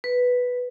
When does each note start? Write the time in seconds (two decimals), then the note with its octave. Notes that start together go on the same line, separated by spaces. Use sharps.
0.04 B4